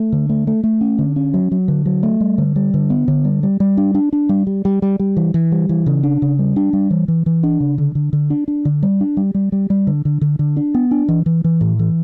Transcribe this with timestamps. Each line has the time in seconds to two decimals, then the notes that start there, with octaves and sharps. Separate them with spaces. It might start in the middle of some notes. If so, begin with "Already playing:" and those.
Already playing: A3
0.12 D3
0.29 A3
0.47 A3
0.64 A3
0.81 C#4
0.98 D3
1.16 C#4
1.34 F#3
1.52 F#3
1.68 D3
1.86 F#3
2.03 A3
2.20 G3
2.38 D3
2.56 G3
2.74 D3
2.90 B3
3.08 D3
3.25 G3
3.43 G3
3.60 G3
3.77 D4
3.95 D4
4.13 D4
4.29 G3
4.47 G3
4.65 G3
4.82 G3
4.99 G3
5.17 E3
5.34 E3
5.52 G3
5.69 E3
5.86 C#3
6.03 D4
6.22 C#3
6.39 G3
6.56 D4
6.73 G3
6.90 E3
7.08 E3
7.26 E3
7.43 D4
7.60 C#3
7.78 D3
7.95 D3
8.13 D3
8.30 D4
8.48 D4
8.65 D3
8.83 G3
9.01 D4
9.17 G3
9.34 G3
9.52 G3
9.70 G3
9.87 D3
10.05 D3
10.21 D3
10.39 D3
10.57 D4
10.75 B3
10.91 D4
11.08 E3
11.26 E3
11.44 E3
11.61 A2
11.79 E3